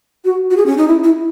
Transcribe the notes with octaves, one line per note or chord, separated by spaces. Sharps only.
F#4
F#4
G#4
C#4
D#4
E4
E4